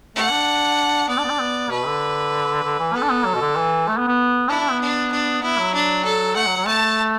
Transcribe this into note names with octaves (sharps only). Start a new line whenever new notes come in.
A3 F#5
D4
B3 D5
D4
B3
D4
B3
B2 B4
D3
D3
E3
B3 A4
D4
B3
F#3
B2
D3
E3
A3
B3
B3
D4 E4
D4
B3
D4
D4
B3 E4
F#3
D4
A4
A3 F#5
F#3
F#3
A3 A5